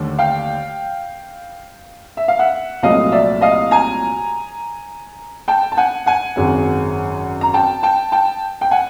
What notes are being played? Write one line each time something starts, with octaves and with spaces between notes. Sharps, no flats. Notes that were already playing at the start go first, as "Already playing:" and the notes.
Already playing: D#2 D3 A3
F5 G5
E5
F5
E5 F#5
C2 A#2 F#3 A3 D#5 F5
D5 E5
D#5 F5
G#5 A#5
G5 A5
A5
F#5 G#5
F#5 G#5
G#1 F#2 C#3 F#3
A#5
G5 A5
G5 A5
G5 A5
G5
F#5 G#5